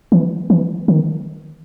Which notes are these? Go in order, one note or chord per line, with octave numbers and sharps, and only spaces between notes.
E3
E3
D#3